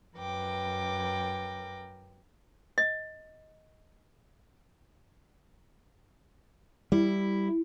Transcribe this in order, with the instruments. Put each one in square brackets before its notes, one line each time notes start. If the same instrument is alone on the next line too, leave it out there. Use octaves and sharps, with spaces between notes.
[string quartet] F#2 A#4 B4 G5 D6
[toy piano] D#5
[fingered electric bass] G3 [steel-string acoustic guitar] E4